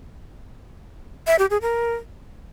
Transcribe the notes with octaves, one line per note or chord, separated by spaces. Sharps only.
E5
G4
G#4
A#4